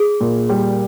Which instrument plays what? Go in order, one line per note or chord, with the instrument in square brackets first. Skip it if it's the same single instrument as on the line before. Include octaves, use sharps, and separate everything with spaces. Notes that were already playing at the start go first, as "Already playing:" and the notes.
Already playing: [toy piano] G#4
[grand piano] A#2
G3